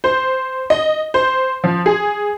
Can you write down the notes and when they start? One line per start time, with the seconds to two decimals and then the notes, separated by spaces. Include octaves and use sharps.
0.04 C5
0.70 D#5
1.14 C5
1.64 F3
1.86 G#4